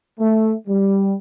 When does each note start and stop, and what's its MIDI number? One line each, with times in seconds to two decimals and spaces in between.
0.19 0.52 57
0.68 1.13 55